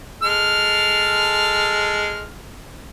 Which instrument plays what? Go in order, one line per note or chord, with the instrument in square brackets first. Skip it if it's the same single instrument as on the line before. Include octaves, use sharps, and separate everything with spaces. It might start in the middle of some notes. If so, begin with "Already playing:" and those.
[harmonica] G#3 A4 F6